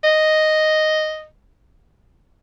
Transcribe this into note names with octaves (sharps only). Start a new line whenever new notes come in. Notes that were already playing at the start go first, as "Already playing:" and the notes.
D#5